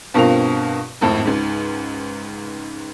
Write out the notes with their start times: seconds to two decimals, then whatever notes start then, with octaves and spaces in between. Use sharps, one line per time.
0.14 G2 B2 C4 F4 A#4 F7
1.01 G#1 F2 A2
1.25 C#2 G#2